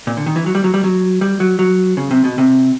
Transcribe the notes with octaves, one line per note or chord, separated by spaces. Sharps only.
A#2
D3
D#3
E3
F#3
G3
F#3
G3
F#3
G3
F#3
F#3
C#3
C3
B2
C3